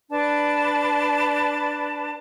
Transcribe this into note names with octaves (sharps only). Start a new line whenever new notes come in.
D4 B4 A5